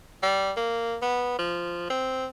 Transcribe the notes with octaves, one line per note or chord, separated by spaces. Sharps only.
G3
A#3
B3
F3
C4